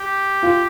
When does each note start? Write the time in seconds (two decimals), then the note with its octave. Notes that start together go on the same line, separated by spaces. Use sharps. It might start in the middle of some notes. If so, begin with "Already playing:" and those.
Already playing: G4
0.43 F4